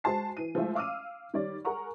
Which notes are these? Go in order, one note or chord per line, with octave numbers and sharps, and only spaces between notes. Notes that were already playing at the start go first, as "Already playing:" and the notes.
G#3 F#4 C5 A5 C7
E3 D#7
F3 G#3 A3 E4 F4
F5 D6 E6 F6 D#7
D#3 G3 C#5 D5
G#4 A#4 F#5 A#5 C#6